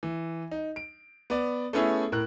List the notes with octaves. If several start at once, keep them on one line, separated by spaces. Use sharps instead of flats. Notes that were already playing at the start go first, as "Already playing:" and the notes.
E3
D#4
D7
B3 D5
A3 B3 C#4 E4 G#4
A2 A#4 F#6